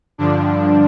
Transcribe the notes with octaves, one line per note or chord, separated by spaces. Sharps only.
G2 D3 F3 D4